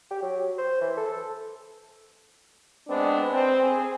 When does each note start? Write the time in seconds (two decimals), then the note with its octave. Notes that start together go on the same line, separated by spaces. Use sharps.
0.11 G4
0.22 F#3
0.58 C5
0.81 E3
0.97 A4
2.88 G#3 B3 C4 D4
3.32 C4
3.62 G#4